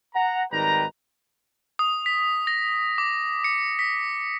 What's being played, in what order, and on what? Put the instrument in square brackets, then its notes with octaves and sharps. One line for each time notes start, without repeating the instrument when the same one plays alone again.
[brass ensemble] F#5 A#5
G#1 D#3 G3 B4 G5 A#5
[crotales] D#6
B6
A#6
D6
C#7
B6